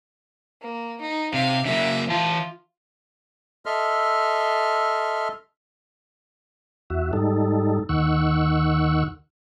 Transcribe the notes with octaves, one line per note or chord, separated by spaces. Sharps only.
A#3
D#4
C3 F5
C#3 F#3 A#3 E5
E3 F4 A5
A4 D#5 E5 C6 F6
E2 F#4 E5
G#2 G3 D#4 A4
D#2 D#3 F#5 C#6 E6